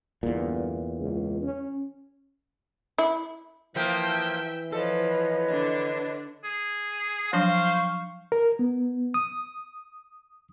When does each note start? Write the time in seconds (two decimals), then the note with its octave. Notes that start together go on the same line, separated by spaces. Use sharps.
0.23 G1 E2 A#2
0.99 C#2
1.42 C#4
2.98 E4
3.76 E3 F3 A#3 E5 G5
4.72 F3 A4 B4 C#5 D#5
5.50 D3 D4
6.44 G#4
7.33 F3 F#3 D4 C5 F5 C#6
8.32 A#4
8.59 B3
9.14 D#6